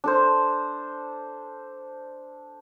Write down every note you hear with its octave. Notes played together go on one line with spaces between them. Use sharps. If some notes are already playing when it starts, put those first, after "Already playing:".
D4 A4 C5